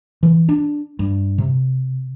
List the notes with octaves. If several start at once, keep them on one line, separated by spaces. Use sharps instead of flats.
E3
D4
G2
C3